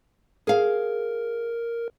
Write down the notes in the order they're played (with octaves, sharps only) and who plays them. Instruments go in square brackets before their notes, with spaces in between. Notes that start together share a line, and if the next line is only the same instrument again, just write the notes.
[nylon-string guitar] G#4 F5 [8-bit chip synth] A#4